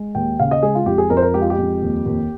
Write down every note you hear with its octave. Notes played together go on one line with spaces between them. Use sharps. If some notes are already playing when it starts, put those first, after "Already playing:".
Already playing: G#3
D#2 G5
C#3 F5
D#5
G#3 G#4
F4
F2 G4
G#4
F2 A#4
C5
A#4
G#3 G4
F4
G4
F2
D#2
D#2